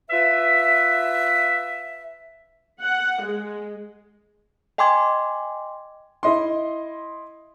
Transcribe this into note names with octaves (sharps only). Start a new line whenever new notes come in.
F4 B4 E5
F#5
G#3
D#5 G5 G#5 C6 D6 G#6
E4 D#5 C6